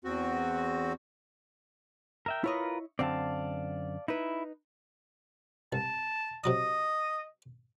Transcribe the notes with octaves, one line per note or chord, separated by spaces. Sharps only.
E2 C4 F#4
A#4 E5 G5
E4 F4 A#4 B4 C#5 D#5
F#2 D3 C4 D5 F5 A5
D#4 E4 B4
C2 A5
C3 F#3 D#5 D#6